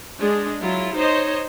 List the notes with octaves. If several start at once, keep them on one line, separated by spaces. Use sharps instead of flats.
G#3 D4 G#4
F#3 E4 F4
D#4 C5 C#5 D#5